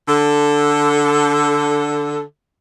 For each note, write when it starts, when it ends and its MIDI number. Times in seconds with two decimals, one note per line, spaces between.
0.08 2.21 50
0.08 2.21 69